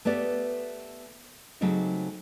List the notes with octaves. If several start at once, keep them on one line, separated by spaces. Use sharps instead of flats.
A3 B3 G4 D5
C#3 F#3 A3 C4 D#4 G4